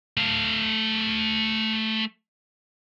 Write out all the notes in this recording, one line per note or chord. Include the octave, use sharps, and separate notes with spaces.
A3 F5